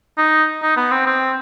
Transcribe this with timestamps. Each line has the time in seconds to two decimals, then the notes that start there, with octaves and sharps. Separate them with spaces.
0.18 D#4
0.63 D#4
0.77 B3
0.91 C4
1.06 C4